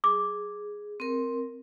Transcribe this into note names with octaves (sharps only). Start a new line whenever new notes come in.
G#4 D6
C4 A#4